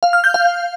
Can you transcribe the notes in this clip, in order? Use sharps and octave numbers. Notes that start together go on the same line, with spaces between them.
F5
F6
G6
F5